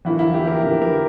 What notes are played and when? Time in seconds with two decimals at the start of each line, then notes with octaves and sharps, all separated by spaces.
0.05 E2 D3 F3 A#3 E4
0.19 E4
0.34 G4
0.47 A#4
0.62 E2 D3 F3 A#3 A#4
0.82 A#4